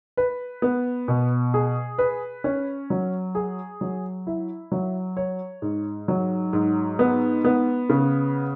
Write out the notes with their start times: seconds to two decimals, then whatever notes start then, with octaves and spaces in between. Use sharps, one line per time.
0.17 B4
0.62 B3
1.08 B2
1.54 G#4
1.98 B4
2.44 C#4
2.90 F#3
3.35 G#4
3.81 F#3
4.27 E4
4.72 F#3
5.17 C#5
5.62 G#2
6.08 F#3
6.53 G#2
6.99 B3
7.45 B3
7.89 C#3